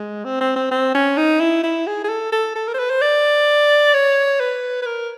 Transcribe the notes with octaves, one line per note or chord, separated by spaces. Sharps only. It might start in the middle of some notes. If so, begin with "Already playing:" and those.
Already playing: G#3
C4
C4
C4
C4
C#4
D#4
E4
E4
G#4
G#4
A4
A4
A4
A#4
C5
B4
C5
D5
C#5
B4
B4
A#4